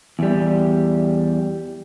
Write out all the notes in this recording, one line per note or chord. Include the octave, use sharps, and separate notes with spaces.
E2 G3